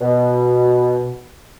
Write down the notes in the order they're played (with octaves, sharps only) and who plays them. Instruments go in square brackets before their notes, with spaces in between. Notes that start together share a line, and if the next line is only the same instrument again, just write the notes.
[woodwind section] B2